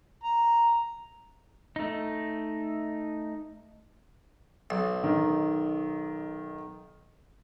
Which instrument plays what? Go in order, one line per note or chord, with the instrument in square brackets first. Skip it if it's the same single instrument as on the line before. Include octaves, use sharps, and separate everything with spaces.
[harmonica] A#5
[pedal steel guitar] A3 D#4
[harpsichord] B1
[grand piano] D#3